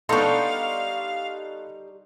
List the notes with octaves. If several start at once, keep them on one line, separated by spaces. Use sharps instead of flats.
G3 B3 D4 D#4 A4 F5 C6 C#6